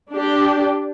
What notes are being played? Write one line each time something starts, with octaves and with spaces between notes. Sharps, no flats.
D4 G4